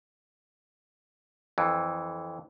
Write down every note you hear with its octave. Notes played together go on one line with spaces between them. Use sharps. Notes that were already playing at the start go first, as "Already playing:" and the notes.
F2 E3